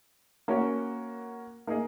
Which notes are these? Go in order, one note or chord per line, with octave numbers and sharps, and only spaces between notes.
A#3 C#4 F#4 C#5
A#3 D#4 G#4 D#5